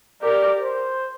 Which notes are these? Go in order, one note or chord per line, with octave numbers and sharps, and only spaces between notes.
G4 A#4 D5
C5